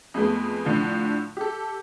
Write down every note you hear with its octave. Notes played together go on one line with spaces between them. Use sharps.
F2 G#3 A3 B3
A2 D3 F3
G4 A4